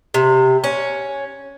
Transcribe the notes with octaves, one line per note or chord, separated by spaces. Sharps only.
C3
C#4